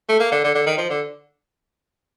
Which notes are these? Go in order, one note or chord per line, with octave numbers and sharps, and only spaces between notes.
A3
A#3
D3
D3
D3
D#3
F3
D3